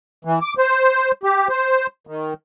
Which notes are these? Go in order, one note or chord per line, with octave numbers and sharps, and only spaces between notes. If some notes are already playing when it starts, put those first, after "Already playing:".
E3
D6
C5
G4
C5
D#3